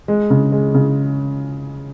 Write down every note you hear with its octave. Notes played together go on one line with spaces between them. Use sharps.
G#3
C#3
G#3
C#3